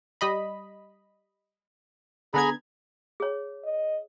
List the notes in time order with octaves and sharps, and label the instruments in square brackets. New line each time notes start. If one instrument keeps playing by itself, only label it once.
[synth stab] G3 D#5 B5
[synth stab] D3 B3 G#6 [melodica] G#4 A#5 B5
[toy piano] G#4 C#5
[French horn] D#5